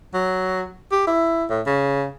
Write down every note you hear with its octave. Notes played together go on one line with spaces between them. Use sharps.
F#3
G4
E4
A2
C#3